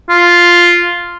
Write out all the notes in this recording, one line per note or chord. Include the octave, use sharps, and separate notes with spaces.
F4